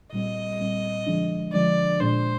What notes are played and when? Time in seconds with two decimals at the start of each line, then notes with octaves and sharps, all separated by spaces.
0.12 A#2 G3 C4 D#5
0.59 A#2 G3 C4
1.06 D3 F3 G#3 D4
1.53 D3 F3 G#3 D4 D5
2.00 A#2 G#3 D4 C5